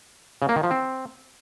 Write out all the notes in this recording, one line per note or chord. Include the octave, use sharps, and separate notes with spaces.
C#3
A#3
D#3
F3
C4